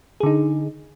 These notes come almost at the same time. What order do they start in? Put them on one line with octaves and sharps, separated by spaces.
G#4 D3 D#4